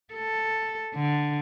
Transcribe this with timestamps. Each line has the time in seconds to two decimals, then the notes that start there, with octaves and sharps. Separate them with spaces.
0.14 A4
0.94 D3